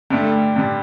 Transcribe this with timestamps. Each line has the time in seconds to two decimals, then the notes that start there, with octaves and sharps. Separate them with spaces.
0.10 G2 D3 G3 A3
0.56 G2 D3 G3